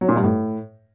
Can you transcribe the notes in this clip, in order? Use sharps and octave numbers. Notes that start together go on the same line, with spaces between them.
F#3
A#2
G2
A2